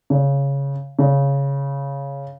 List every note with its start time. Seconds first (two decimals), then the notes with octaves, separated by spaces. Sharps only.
0.10 C#3
0.99 C#3